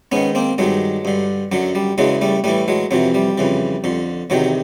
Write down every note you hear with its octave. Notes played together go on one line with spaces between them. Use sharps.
G#2 D#3 B3 C#4
A#3 C4
G2 D#3 F#3 G#3
G2 D3
F#2 D3 F#3
G3
E2 C#3 E3 F#3 G#3
G3 A3
A2 E3 G3 A3
F#3 G#3
F2 C3 E3 F#3
G3
F2 C#3 E3
F2 D3
E2 C3 D#3 F#3